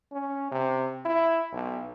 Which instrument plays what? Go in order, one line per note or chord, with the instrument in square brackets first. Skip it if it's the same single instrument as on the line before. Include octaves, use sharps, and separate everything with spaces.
[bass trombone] C#4
C3
E4
B1